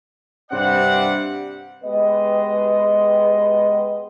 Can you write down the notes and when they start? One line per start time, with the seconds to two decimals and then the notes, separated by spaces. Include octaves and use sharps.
0.51 G2 C3 G3 C4 D5 F#5
1.83 G#3 B3 G4 B4 D#5